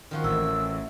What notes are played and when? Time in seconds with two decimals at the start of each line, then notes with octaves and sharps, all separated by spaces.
0.11 D#3 F3 F#4
0.24 A1 E4 E6